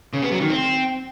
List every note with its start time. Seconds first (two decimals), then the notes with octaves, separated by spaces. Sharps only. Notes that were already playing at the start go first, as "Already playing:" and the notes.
0.13 C#3
0.23 B3
0.32 F#3
0.41 D#3
0.50 C4